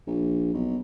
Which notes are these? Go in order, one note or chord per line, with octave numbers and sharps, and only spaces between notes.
A#1
B1